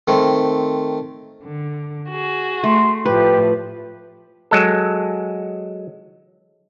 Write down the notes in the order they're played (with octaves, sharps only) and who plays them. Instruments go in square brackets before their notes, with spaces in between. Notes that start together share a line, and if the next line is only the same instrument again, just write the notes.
[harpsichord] D#3 A3 C4
[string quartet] D3
F#4 G#4
[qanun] A3 [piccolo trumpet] C6
[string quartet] A2 F3 [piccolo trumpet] G4 [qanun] B4
[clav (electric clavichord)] F#3 G#3 A4